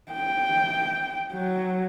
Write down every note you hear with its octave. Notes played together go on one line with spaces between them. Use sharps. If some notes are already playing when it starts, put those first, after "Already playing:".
G5
F#3